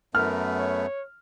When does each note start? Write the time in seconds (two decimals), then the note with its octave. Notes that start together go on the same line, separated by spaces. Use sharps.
0.15 F#2 A3 B3 A#4 F6
0.59 C#5